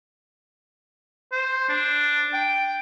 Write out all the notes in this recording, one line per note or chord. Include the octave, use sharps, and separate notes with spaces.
C5
D4
G5